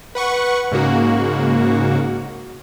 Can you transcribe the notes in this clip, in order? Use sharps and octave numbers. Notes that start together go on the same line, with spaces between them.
B4 F#5 C#6
G#2 C#3 A#3 F#4